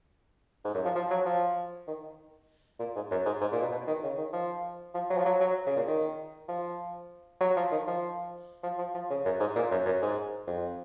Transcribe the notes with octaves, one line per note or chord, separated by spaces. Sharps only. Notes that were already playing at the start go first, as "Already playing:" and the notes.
G#2
F#2
F3
F3
F#3
F3
D#3
A#2
G#2
F#2
G#2
G#2
A#2
B2
B2
D#3
C#3
D#3
F3
F3
F#3
F3
F#3
F#3
C#3
A#2
D#3
F3
F#3
F3
D#3
F3
F3
F3
F3
C#3
F#2
G#2
A#2
F#2
F#2
G#2
F2